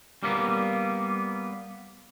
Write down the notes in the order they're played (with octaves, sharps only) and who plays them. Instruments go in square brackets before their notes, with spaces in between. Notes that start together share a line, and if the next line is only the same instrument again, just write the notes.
[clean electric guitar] G3 A#3 B3